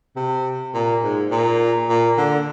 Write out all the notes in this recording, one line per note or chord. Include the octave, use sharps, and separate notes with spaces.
C3
A#2
G#2
A#2
A#2
D3